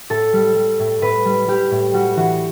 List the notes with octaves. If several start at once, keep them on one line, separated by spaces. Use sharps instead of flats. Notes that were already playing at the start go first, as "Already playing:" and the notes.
A2 A4
G3
G3
A2
A2 B4
G3
G3 G4
A2
G3 F#4
E3 F#4